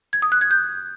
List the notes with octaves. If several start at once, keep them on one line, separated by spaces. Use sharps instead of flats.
G#6
D#6
F#6
G#6
G6